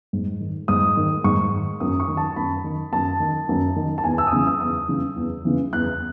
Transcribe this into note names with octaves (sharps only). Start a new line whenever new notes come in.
G#2
D#3
G#2 D#6
D#3
G#2 C#6
D#3
F#2 D#6
C#6
D#3
A5
F#2 B5
D#3
F#2 A5
D#3
F#2
D#3
A5
E2 G#5
E6
D#6
C#3 E3 E6
E6
E2 D#6
C#3 E3
E2
C#3 E3
E2 F#6